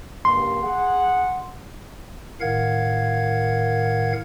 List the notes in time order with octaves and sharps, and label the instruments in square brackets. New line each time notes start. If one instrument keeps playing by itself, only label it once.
[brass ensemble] C#2 G2 A#3 [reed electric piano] C6
[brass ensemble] G#4 F#5
[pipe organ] A2 D#3 A#4 F5 F#5 G#6